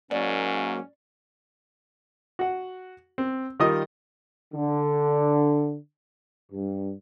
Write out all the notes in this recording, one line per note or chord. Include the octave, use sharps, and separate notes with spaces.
G#2 F#3 A#3 C#4 D5
F#4 F#5
C4
D#3 G3 F4 A#4 D#5 D#6
D3
G2